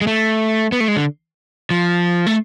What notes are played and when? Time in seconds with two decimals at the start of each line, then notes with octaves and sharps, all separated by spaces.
0.01 G#3
0.07 A3
0.72 B3
0.80 A3
0.88 G#3
0.97 D3
1.70 F3
2.26 A3